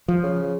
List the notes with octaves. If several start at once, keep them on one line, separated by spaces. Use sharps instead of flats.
F3
C#3